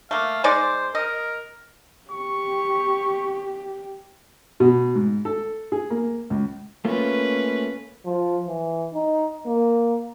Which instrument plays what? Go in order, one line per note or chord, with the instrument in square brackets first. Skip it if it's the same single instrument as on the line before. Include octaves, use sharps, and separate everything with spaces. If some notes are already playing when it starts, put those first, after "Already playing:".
[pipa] A3 A#3 [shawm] F5
[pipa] G#3 D#4 D5 [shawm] C5
[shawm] A#4 [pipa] D#5
[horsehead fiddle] G4 [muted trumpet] C#6
[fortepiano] B2
G#2
A4
G#4
A#3
C#2
[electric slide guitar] A3 A#3 F4 [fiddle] C#4 B4
[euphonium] F3
E3
D#4
A#3